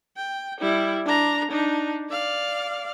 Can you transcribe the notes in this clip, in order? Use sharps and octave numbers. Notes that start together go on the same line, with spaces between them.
G5
G3 E4
D4 A#5
D4 D#4
D5 F5